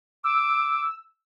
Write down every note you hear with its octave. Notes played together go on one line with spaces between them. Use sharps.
D6 E6